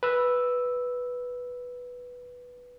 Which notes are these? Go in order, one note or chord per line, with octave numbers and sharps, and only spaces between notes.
B4 E6